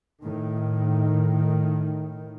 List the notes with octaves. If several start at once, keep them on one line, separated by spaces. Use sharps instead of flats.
A2 D#3